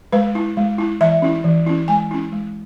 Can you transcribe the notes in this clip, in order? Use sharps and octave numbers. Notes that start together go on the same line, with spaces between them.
G#3 B4
E4
G#3
E4
E3 E5
C#4 E4
E3
C#4 E4
G#3 G#5
C#4 E4
G#3